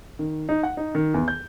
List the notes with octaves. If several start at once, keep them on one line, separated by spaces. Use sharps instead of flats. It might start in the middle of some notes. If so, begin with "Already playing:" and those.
D#3
D#4
F#5
D#4
D#3
E2
G6